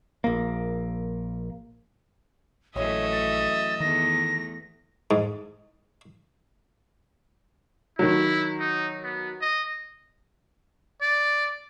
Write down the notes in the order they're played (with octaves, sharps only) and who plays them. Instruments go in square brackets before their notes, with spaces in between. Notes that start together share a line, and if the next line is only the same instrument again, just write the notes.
[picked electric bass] A#1 A#3
[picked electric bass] A#1 [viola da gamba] F#2 E3 A3 [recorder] C#5 [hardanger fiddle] D#5 E5
[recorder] A6
[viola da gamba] E2 A3 [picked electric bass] D#3 [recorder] A#6
[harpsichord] G#2
[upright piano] D#3 F#3 [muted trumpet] E4
[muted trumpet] D#4
B3
D#5
D5